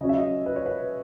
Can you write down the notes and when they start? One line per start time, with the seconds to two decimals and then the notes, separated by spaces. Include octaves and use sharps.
0.01 C#3 F#3 C#4 D#5
0.09 E5
0.18 D#5
0.46 B4
0.56 C#5
0.66 B4